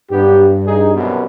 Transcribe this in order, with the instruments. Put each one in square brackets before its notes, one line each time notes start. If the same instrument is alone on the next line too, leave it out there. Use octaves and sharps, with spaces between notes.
[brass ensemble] G2 [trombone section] F#3 B3 G4
[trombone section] D#4 G#4
C2 F#2 B2